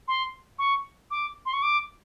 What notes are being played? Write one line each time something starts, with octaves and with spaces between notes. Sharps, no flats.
C6
C#6
D6
C6
C#6
D6